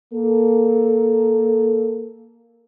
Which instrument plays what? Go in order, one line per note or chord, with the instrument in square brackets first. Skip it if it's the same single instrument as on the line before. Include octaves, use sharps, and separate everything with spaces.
[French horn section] A#3 A4